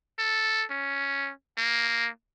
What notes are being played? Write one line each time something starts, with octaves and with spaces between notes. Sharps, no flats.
A4
C#4
A#3